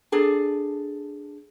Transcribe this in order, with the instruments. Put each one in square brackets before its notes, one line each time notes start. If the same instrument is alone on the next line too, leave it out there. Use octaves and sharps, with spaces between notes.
[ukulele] D4 G#4 A4